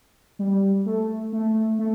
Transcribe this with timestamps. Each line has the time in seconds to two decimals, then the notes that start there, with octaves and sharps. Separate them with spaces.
0.39 G3
0.86 A3
1.32 A3
1.79 A3